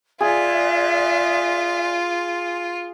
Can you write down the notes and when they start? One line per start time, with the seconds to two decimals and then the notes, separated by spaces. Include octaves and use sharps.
0.20 F4 G#4 D5 E5 F#6